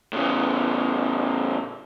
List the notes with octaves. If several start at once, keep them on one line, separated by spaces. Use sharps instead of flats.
A2 C#3